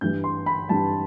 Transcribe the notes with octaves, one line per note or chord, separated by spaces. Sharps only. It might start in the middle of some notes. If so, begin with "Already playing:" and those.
G2 E3 G3 G6
C6
B5
G2 E3 G3 A5